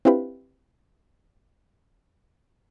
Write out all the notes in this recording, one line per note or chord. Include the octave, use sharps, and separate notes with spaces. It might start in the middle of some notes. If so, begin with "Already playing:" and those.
C4 D4 E4 F4 G4 B4